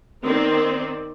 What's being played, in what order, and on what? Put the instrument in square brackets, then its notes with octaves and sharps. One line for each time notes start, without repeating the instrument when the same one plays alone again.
[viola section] D#3 B3 C4 D5